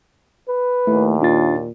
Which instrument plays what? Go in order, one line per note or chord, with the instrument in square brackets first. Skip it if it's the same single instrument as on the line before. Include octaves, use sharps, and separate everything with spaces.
[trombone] B4
[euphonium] D#2 [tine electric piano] A3 E4
[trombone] A#2 [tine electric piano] D4 F4 A6